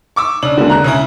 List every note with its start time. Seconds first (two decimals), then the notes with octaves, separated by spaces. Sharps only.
0.16 C#6 D6 E6
0.43 C#3 D4 F#7
0.57 D3 G#3 A#3
0.70 A#5 F#6
0.84 C#3 C#4 E4